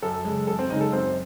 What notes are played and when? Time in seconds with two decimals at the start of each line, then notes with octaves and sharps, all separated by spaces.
0.02 F#2 A4
0.25 C#3 G#3
0.47 F#2 A4
0.59 C4 C5
0.70 C#3 G#3 D#4 D#5
0.81 A4
0.92 F#2 C4 C5